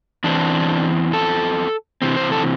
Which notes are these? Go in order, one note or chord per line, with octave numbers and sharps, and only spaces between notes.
E2 E3 C4 D4
A4
C3 E3 C4
C5
A4